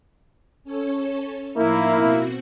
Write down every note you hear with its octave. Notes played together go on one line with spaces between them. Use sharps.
C#4 A4 C#5
A2 F3 A#3 D#4 E4
B2 C4 F#4